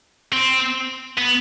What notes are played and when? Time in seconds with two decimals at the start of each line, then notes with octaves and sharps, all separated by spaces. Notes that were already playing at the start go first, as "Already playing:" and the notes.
0.33 C4
1.18 B3